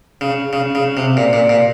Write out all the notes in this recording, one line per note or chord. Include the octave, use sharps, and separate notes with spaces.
C#3
C#3
C#3
C3
A#2
A#2
A#2